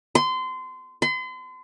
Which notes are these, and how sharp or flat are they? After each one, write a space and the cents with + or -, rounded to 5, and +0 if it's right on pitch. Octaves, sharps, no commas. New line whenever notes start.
C6 -25
C6 -40